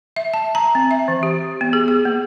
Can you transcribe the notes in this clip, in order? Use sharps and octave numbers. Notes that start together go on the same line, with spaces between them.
E5
A5
A#5
C4
E5
E3
G4
B3
G#4
G#4
A#3